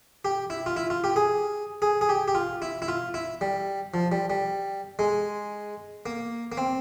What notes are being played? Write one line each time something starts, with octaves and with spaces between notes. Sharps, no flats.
G4
E4
F4
E4
F4
G4
G#4
G#4
G#4
G4
G4
F4
E4
E4
F4
E4
G3
F3
G3
G3
G#3
A#3
A#3
C4